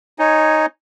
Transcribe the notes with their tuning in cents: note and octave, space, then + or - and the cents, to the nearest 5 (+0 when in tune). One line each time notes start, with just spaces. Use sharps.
D#4 +0 C#5 -10 G#5 +0